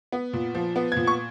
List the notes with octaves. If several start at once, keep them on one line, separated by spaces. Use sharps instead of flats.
B3
A#2
F3
B3
G#6
A#2
C#6